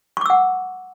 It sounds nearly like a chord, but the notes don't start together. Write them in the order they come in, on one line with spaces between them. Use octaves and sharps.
C#6 D6 E6 F#5